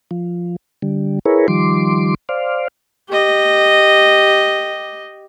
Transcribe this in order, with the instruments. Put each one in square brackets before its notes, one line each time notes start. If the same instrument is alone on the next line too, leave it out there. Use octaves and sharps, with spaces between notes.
[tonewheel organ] F3
D3 G3
E4 G#4 A#4 B4 C#5
D#3 F3 G3 C6 D6
C5 D5 F5
[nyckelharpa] G4 D#5